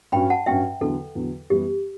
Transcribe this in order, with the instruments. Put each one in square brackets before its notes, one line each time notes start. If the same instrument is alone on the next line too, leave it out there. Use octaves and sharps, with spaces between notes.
[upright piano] G2 F#3 C#4 F#4 [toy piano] G5 B5
[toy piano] F#5 A5
[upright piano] G2 F#3 C#4 F#4 [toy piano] E5 G5
[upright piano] E2 D3 F#3 [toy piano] A4
[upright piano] E2 D3 F#3
[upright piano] F#2 E3 G3 B3 [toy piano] G4